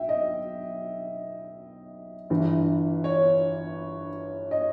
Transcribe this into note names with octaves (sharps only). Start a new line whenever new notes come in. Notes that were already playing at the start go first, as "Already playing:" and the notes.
Already playing: B1 E5 G5
D#5
G1 G2 E3
C#5
D#5